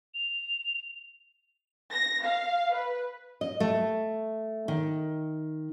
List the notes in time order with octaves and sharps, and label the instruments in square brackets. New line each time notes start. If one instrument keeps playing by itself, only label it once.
[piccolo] F7
[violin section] A#6
F5
B4
[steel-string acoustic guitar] D#5
A3
D#3